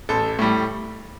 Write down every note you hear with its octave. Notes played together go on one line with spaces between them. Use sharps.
A1 A4
A2 G3